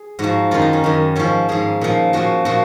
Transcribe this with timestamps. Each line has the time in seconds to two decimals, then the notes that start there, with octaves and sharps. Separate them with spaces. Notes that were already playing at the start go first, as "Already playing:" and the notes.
Already playing: G#4
0.19 G#2 F3 F#4
0.51 F#2 D#3 F4
0.62 D#4
0.73 C#4
0.84 F#2 D#3
1.16 G#2 F3 C#4
1.49 G#2 F3 G#4
1.81 A#2 F3
2.13 A#2 F3 F#4
2.45 A#2 F3 F#4